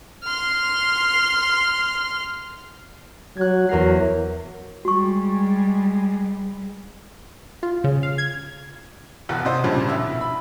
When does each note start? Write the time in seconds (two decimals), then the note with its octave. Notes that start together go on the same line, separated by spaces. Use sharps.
0.23 C6 F6
3.37 F#3 F#6 G#6
3.69 E2 F#3 A#4 C7
4.85 G3 G#3 F#4 C#6
7.63 F4
7.84 C#3
8.03 F5
8.18 G#6
9.29 E1 E2 B2 F#4
9.45 C3 C5 D#5
9.64 F2 A#2 C#3 G3 D4
9.89 A#1 B2 E4 E6
10.21 B5